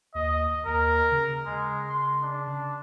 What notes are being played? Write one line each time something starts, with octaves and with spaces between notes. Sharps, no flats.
D#2 D#5
D#2 A#4
C#3
G#3
C6
D4